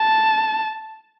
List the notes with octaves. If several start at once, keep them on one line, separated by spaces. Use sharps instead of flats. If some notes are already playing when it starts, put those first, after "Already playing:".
Already playing: A5